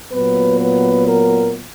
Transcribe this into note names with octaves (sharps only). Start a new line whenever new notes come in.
A#2 F#3 B3 B4
B4
A#4